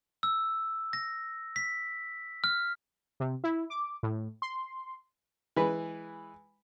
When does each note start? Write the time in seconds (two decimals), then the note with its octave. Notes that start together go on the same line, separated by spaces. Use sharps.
0.23 E6
0.93 A#6
1.56 B6
2.44 F6
3.20 C3
3.44 E4
3.70 D6
4.03 A2
4.42 C6
5.56 E3 G#3 B4